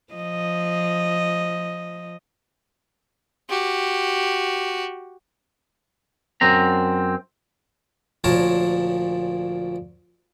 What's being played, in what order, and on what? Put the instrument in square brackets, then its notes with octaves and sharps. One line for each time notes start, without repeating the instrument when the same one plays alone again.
[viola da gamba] F3 D#5
[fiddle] F#4 G4
[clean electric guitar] F#2 C4 A#5
[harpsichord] D2 A#2 F3 A#4 C#5 A5